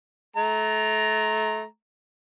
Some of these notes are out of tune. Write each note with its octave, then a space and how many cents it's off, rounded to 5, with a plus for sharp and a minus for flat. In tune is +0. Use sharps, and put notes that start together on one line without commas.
A3 -30 A#5 +0